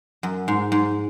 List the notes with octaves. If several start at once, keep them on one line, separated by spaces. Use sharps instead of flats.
F#2
G#2
G#2